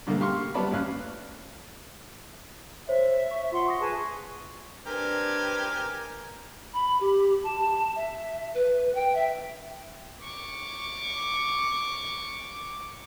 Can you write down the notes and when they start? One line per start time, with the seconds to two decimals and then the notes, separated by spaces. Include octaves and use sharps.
0.07 G2 B2 D3 A3 A#3
0.20 G4 F5 C6 C#6 F6
0.54 G3 B3 D5 A5 B5
0.71 A1 D#2 C#4 F5 F#6
2.88 C5 C#5 E5
3.31 C#6
3.52 F4 F#5 C6
3.66 C#6 D#6 A#6
3.80 G#4 B4 A5
4.86 C4 D4 G4 A#4 B4 G#5
6.73 B5
7.01 G4
7.44 A5
7.96 E5
8.55 B4
8.95 G5
9.15 E5
10.24 C#6 D6